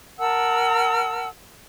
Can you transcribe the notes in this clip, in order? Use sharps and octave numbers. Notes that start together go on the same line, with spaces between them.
A#4 F#5 A5 E6